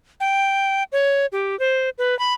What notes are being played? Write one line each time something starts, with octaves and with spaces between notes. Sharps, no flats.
G5
C#5
G4
C5
B4
B5